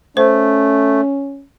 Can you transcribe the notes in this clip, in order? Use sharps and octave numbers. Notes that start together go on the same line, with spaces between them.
A3 C#4 C5